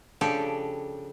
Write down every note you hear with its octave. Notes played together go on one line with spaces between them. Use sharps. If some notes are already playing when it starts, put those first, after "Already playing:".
C#3 F3 D4 G4 A4 D5